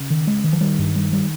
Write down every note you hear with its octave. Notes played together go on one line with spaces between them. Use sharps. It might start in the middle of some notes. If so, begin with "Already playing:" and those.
Already playing: C#3
D#3
G#3
D#3
F3
D#3 G3
G2
G3
G3